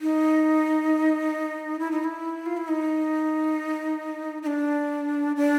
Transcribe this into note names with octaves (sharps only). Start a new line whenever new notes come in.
D#4
E4
D#4
E4
F4
E4
D#4
D#4
D4
D4